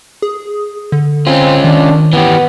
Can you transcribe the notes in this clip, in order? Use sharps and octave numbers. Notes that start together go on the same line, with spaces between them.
G#4
D3
C4 C#4 F4
D#3 D4
E3 B3 G4